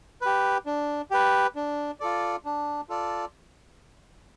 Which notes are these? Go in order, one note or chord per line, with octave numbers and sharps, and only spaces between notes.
G4 B4
D4
G4 B4
D4
F4 A4 D5
D4
F4 A4 D5